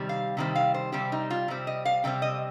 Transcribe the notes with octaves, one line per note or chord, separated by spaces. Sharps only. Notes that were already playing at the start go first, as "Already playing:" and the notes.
Already playing: C3 D#3 G3 C4
F5
C3 D#3 G3 C4
F5
C5
C3 G3 C4 G4
D#4
F4
C3 G3 C4
D#5
F5
C3 G3 C4 G5
D#5